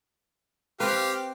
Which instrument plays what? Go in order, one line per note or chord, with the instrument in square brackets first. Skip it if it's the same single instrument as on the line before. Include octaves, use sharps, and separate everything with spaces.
[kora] C4 B4 [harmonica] G4 F5